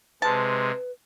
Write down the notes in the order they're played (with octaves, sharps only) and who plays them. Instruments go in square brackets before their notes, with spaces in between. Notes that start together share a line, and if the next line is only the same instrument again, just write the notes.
[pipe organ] C3 G#3 [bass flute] B4 [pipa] A5